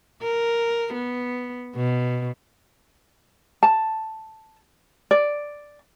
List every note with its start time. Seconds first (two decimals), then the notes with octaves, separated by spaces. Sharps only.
0.22 A#4
0.93 B3
1.75 B2
3.63 A5
5.11 D5